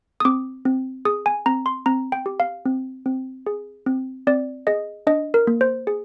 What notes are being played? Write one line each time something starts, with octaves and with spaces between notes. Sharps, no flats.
D#6
C4 D6
C4
G#4 D#6
G#5
C4 A#5
C6
C4 A#5
G5
G4
F5
C4
C4
G#4
C4
C4 D5
G#4 D#5
D4 D#5
A#4
A#3
C5
G#4